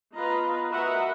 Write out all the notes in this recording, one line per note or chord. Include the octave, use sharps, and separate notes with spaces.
B3 F4 B4 D#5 A#5
F#4 A#4 B4 D#5 E5 F#5